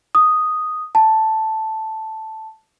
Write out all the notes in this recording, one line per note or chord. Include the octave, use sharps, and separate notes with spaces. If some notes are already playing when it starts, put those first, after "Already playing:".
D#6
A5